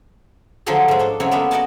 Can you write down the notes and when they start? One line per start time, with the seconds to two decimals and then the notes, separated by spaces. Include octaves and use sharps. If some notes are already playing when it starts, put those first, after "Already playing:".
0.66 D3 F3 F#3 F#4 G#4 A4
0.88 G#2 G#3
0.99 D4 A4
1.20 C#3 F#3 C4 E4 C#5
1.31 G#3 A#3 B3 D4 A4 E5
1.51 F#4 D5 D#5 F#5 G#5 A5